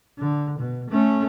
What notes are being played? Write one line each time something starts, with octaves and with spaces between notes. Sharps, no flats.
D3
B2
A3 C#4